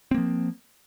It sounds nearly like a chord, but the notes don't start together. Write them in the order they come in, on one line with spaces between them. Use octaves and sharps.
C4 A#3 F3